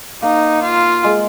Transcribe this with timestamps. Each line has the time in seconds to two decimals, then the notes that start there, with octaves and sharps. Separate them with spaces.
0.22 A#3 D#4
0.63 F4
1.04 G#3